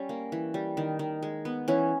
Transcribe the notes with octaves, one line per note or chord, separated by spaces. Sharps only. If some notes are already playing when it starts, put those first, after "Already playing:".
Already playing: G3 C#4
A#3
E3
G3
D#3
D#3
G#3
B3
E3 C#4